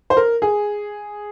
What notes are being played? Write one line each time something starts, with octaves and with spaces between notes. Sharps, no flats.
C5
A#4
G#4